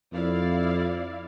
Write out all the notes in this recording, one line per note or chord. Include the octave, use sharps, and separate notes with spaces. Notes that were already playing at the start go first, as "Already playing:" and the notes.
F2 E4 D5 F5